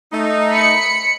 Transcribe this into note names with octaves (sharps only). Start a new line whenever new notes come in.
A3 D#4
B5 C#7